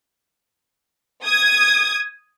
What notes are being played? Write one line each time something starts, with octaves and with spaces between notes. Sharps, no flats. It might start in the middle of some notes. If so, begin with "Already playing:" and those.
D#6 G#6